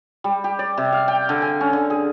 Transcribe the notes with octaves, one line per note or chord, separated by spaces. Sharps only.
G3
G4
D5
C3
F5
G5
D3
G#5
C#4
D3
G#4